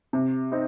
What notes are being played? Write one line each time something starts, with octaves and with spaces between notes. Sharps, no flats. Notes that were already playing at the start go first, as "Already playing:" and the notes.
C3
C4 D#4